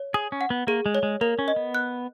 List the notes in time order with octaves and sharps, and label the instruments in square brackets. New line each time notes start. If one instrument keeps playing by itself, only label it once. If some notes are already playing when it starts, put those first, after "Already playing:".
Already playing: [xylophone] C#5
[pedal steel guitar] G#4 [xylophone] D#6
[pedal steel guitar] C#4
[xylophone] F#5
[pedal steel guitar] B3
[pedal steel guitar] A#3 [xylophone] G#4
[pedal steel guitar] G#3
[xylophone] C#5
[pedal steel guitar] G#3
[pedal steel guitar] A#3 [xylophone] A#4
[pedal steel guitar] C#4
[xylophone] D#5
[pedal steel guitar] B3
[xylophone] F#6